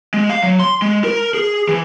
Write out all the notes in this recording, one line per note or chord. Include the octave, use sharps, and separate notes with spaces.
G#3
F5
F#3
C6
G#3
A#4
G#4
E3